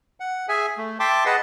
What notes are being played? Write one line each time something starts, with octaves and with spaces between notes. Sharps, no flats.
F#5
G#4 E5 G#5
A3
E5 G5 A5 C6 D6
G#4 B4 D#5 F#5 A5